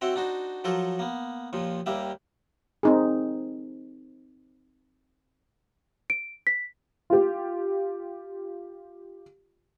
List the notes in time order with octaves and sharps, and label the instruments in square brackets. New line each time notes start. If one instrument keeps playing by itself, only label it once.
[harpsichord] C4 F#4 C#5 E5 G5
D4 D#4 F#4 C5
F3 F#3 A4 A#4 C5 C#5
A#3 B3
D#2 A#2 F3
D#2 G3 A#3 G4 E5
[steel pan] C4 D#4 G#4
[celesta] D7
B6
[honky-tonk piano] F4 G4